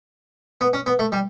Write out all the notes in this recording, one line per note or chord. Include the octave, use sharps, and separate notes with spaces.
B3
C#4
B3
A3
G3